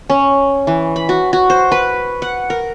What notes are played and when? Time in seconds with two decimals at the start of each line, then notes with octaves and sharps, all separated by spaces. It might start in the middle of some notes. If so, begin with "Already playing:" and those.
0.10 C#4
0.67 E3
0.96 B5
1.09 F#4
1.33 F#4
1.50 C5
1.72 B4
2.22 F#5
2.50 A#4